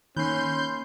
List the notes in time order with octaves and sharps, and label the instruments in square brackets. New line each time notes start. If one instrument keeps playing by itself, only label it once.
[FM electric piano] D#3 [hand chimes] A#3 B5 F#6 [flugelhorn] C#4 [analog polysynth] C6 G6